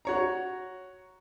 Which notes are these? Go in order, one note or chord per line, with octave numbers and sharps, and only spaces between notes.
F#4 C#5 A#5